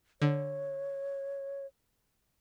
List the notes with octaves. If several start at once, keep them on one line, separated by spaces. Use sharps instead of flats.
D3 C#5